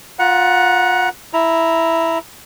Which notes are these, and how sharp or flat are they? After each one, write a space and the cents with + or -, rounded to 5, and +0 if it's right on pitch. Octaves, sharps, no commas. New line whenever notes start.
F4 +25 F#5 +0 A#5 +35
E4 +0 A#5 +0